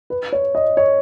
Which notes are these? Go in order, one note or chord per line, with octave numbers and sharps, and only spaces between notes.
B4
C#5
D#5
C#5